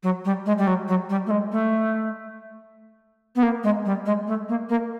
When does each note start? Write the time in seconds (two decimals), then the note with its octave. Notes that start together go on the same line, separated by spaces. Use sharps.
0.03 F#3
0.25 G3
0.46 G#3
0.58 G3
0.67 F#3
0.88 F#3
1.10 G3
1.26 A3
1.31 G#3
1.52 A3
3.36 B3
3.43 A#3
3.64 G#3
3.85 G3
4.06 G#3
4.27 A3
4.49 A#3
4.69 A#3